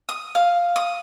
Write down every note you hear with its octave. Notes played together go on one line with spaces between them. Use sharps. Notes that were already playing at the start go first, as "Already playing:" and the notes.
D#6
F5
D#6